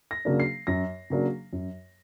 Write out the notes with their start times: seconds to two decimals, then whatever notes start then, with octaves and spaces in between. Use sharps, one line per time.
0.11 A#6
0.25 C#3 F#3 A#3 D4
0.40 C7
0.67 F#2 A#6
1.10 C#3 F#3 A#3 D4
1.53 F#2